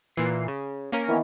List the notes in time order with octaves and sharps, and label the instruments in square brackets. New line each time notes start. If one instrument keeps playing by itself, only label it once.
[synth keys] A#2 E3 C7
C#3
A#3 C#4 A#4
[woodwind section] D#3 E3 B3